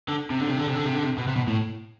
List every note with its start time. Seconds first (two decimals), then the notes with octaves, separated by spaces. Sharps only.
0.09 D3
0.30 C3
0.40 D3
0.49 C3
0.58 D3
0.67 C3
0.76 D3
0.85 C3
0.94 D3
1.04 C3
1.18 B2
1.27 C3
1.36 B2
1.47 A2